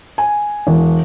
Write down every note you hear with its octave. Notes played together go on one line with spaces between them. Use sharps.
G#5
E1